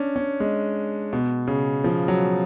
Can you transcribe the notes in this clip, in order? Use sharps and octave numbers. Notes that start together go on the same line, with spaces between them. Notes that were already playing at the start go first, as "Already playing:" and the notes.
Already playing: C#4 D4
C#4
G#3
B2
C#3
F3
F#3